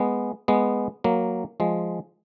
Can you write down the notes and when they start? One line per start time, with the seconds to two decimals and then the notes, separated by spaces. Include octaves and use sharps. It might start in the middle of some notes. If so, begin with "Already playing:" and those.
Already playing: G#3 B3
0.48 G#3 B3
1.04 F#3 A#3
1.60 F3 G#3